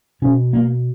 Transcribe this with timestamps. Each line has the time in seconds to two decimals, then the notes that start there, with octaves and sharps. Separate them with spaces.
0.22 B2 C#4
0.53 A#3